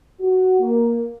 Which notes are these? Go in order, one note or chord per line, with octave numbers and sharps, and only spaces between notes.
F#4
A#3